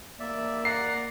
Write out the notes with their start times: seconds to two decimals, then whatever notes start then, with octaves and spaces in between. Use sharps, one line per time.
0.20 A#3 D5 E5
0.65 D5 F#5 A#5 C7